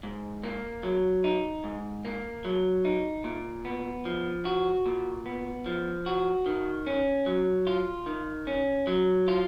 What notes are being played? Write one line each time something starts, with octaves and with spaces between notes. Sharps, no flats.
G#2
A#3
F#3
D#4
G#2
A#3
F#3
D#4
A#2
B3
F3
F#4
A#2
B3
F3
F#4
D#3
C#4
F#3
F4
D#3
C#4
F#3
F4